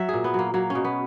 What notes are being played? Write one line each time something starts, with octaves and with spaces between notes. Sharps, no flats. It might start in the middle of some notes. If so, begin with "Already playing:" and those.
Already playing: F#3 E5
A#2 G#4
B3
F#3 A#3
F#3 A#3
C#4
B2
B3